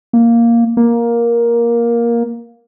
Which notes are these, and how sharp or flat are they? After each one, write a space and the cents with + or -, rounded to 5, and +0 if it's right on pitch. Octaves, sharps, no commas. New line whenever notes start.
A#3 +0
A#3 +10